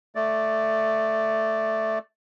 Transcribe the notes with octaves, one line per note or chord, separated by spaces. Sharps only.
A3 D5